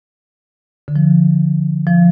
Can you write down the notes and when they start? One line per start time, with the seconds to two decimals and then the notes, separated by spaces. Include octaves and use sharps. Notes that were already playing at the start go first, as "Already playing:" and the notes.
0.88 D3
0.96 F3
1.87 F3